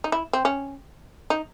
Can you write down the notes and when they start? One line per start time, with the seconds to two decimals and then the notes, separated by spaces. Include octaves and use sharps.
0.04 D#4
0.12 E4
0.33 C4
0.45 C#4
1.30 D#4